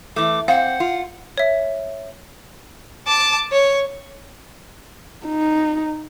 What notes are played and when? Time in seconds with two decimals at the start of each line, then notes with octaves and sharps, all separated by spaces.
0.16 E3 A3 D6
0.48 C4 F5 F#5
0.80 F4
1.38 C#5 E5
3.07 A5 D6
3.52 C#5
5.26 D#4